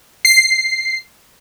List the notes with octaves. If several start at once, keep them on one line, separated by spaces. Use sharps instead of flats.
C7